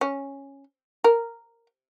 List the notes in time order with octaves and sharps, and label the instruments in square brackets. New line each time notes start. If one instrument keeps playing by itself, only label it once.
[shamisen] C#4
A#4